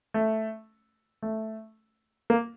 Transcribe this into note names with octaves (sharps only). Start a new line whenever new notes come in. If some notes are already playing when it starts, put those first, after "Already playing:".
A3
A3
A#3